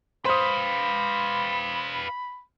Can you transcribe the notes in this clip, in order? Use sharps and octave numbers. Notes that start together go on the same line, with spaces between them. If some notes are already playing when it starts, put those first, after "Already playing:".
B4 C5 F5 B5 D#6